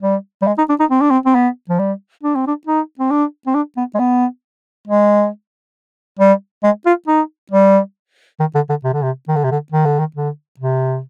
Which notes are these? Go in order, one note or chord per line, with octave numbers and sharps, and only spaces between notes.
G3
G3
G#3
D#4
D4
D#4
C4
D4
C4
C4
B3
F3
G3
D4
C4
D4
D#4
C4
D4
C4
D4
B3
G#3
B3
G#3
G3
G#3
F4
D#4
G3
D#3
D3
D3
C3
D3
C3
D#3
D3
C3
D3
D#3
D3
D#3
D3
C3